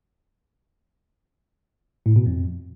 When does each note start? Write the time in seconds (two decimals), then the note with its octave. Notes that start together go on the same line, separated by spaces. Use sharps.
2.06 A2
2.16 B2
2.26 F2